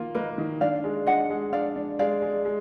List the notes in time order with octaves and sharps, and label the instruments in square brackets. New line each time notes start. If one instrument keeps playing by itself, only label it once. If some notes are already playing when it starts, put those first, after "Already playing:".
Already playing: [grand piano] D#3 A#3 F4
[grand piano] A#3 [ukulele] B4 D#5
[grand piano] D#3
[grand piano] D4 [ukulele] D5 F5
[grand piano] G#3
[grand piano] D4 [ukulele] D#5 F#5
[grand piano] G#3
[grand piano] D4 [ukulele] D5 F5
[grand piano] D4
[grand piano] G#3 [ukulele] D5 F5
[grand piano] G#3
G#3